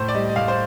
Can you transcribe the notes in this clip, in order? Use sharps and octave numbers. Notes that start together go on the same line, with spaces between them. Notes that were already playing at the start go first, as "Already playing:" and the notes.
Already playing: A2 C5
D5
G3 D#5
D#5
A2 F5
C5